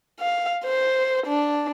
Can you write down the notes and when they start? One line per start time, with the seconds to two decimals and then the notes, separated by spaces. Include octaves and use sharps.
0.20 F5
0.65 C5
1.26 D4